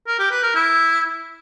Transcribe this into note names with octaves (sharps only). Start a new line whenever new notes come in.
A#4
G4
B4
A#4
E4